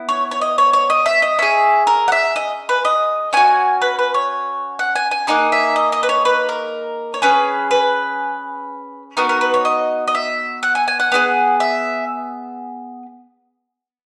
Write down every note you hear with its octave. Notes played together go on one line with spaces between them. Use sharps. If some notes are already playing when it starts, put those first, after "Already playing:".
Already playing: B3 E4
C#5
C#5
D#5
C#5
C#5
D#5
E5
D#5
C#4 G#4 E5
A#4
F#5
E5
D#5
B4
D#5
C#4 F#4 G#5
B4
B4
C#5
F#5
G#5
G#5
A#3 D#4 G#4 F#5
E5
D#5
D#5
B4
C#5
B4
A#4
C#5
C#4 G#4 B4
B4
B3 D#4 F#4 A#4
A#4
B4
C#5
D#5
D#5
E5
F#5
G#5
G#5
F#5
B3 D#4 G#4
E5